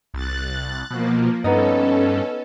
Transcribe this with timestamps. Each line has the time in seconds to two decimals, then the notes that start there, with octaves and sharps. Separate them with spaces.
0.14 C2 F#6 A6
0.91 B2 F3 A#3
1.44 G2 B3 C#4 D#4 A4 D#5